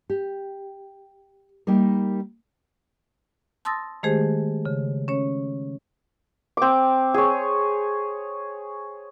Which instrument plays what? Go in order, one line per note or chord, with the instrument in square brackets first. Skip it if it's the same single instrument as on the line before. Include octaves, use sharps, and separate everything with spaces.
[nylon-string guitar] G4
G3 A#3 D#4 A#4
[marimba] A5 C6 D#6 E6 A6 A#6
D#3 G#3 A3 G4 G#4 C5
C#3
C#4 C#5
[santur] C4 D6
G#4 C#5